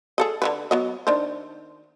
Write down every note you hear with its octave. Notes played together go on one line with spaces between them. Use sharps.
G#4 A4 D#5
D3 D#3 B4
F#3 B3 D#5
D#3 D4 C5